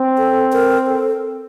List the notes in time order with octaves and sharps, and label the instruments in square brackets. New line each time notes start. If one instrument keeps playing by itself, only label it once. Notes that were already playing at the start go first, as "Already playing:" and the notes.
Already playing: [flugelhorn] C4
[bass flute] A4
A#4
A4